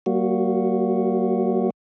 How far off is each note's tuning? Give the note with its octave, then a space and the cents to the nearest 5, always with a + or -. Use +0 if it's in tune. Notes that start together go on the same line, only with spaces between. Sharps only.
G3 -45 A#3 +0 F#4 +0